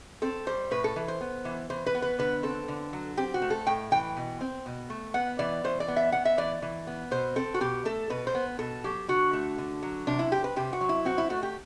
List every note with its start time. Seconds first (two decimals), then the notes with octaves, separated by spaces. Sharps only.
0.22 C4 A4
0.47 G3 C5
0.71 A2 B4
0.84 A4
0.96 E3
1.08 C5
1.21 B3
1.45 E3
1.70 E3 C5
1.86 B4
1.95 B3
2.02 B4
2.19 D3 B4
2.43 C4 A4
2.68 D3
2.93 F#3
3.17 C4 G4
3.34 F#4
3.42 A3
3.50 A4
3.66 A2 G5
3.91 E3 G5
4.17 B2
4.41 C4
4.66 B2
4.90 A3
5.14 B3 F#5
5.39 E3 D5
5.64 E3 C5
5.80 D5
5.88 B3
5.96 E5
6.12 B3 F#5
6.25 E5
6.38 E3 D5
6.62 E3
6.87 B3
7.11 B2 C5
7.36 C4 A4
7.54 F#4
7.60 B2 G4
7.85 A3 A4
8.10 B2 B4
8.27 C5
8.35 B3
8.59 B2 A4
8.84 F#3 G4
9.08 D3 F#4
9.33 A3
9.58 D3
9.83 F#3
10.07 C3 D4
10.19 E4
10.31 C4 G4
10.44 B4
10.56 C3 G4
10.73 F#4
10.81 F#3
10.89 E4
11.05 C4 F#4
11.18 E4
11.30 A3 F#4
11.43 G4